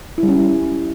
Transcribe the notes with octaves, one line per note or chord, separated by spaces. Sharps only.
E4
G3
C#4